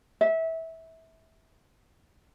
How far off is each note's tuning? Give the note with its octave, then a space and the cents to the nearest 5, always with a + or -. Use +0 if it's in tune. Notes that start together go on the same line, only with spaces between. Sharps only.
E5 -20